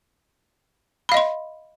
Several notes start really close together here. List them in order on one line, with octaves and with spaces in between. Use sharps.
B5 F5 D#5 C6